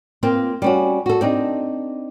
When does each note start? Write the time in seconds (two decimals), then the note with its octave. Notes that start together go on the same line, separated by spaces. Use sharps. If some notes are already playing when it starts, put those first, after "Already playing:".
0.23 A#3 C4 F4
0.62 G3 C#4 F#4
1.06 F#4 A4
1.21 C4 D4 D#4